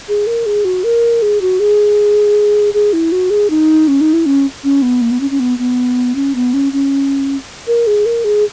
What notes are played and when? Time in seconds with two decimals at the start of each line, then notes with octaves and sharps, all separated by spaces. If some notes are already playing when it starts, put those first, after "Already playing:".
0.09 G#4
0.27 A#4
0.46 G#4
0.65 F#4
0.84 A#4
1.22 G#4
1.41 F#4
1.60 G#4
2.74 G#4
2.93 E4
3.12 F#4
3.30 G#4
3.50 D#4
3.88 C#4
4.01 D#4
4.13 E4
4.26 C#4
4.64 C#4
4.82 B3
5.01 A#3
5.11 B3
5.20 C#4
5.31 C#4
5.40 B3
5.59 B3
6.15 C#4
6.35 B3
6.54 C#4
6.73 C#4
7.67 A#4
7.87 G#4
8.06 A#4
8.24 G#4